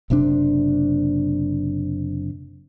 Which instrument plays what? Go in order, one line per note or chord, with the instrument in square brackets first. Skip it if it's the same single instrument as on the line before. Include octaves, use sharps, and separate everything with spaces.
[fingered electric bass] F#1 C3 C4 D4